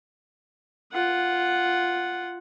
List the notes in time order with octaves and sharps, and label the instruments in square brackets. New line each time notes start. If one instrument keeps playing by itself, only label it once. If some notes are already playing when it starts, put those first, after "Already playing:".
[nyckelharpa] F4 F#5